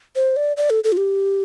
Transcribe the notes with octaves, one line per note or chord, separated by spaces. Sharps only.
C5
D5
D5
A4
A4
F4
G4